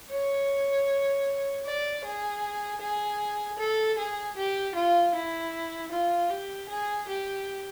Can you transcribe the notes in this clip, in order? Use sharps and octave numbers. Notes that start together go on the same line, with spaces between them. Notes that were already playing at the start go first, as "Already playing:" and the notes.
C#5
D5
G#4
G#4
A4
G#4
G4
F4
E4
F4
G4
G#4
G4